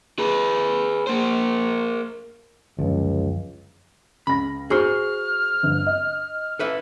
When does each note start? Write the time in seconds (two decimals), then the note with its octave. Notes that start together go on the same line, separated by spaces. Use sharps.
0.19 G#4 B4
1.07 A#3 C5
2.79 C#2 F#2 D3 F3
4.27 C#2 B5 A#6
4.70 F#4 G#4 C5 C#6 F6
5.63 G1
5.86 D#5
6.59 A4 B4 E5